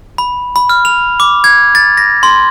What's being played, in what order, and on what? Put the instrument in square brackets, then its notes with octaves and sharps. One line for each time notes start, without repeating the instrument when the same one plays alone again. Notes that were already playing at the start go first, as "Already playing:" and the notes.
[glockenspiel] B5
B5
F6
F7
D6
G#6
A6
A#6
C6